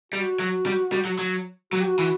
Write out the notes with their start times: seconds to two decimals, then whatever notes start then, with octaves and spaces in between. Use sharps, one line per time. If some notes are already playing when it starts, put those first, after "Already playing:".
0.12 G3 F#4
0.40 F#3
0.66 G3
0.92 G3
1.05 F#3
1.19 F#3
1.72 F#3 F#4
1.80 G4
1.87 F#4
1.99 E3 F#4